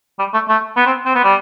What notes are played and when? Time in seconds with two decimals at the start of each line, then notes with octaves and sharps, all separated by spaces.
0.19 G3
0.34 A3
0.48 A3
0.76 B3
0.86 C4
1.05 C4
1.15 B3
1.24 G3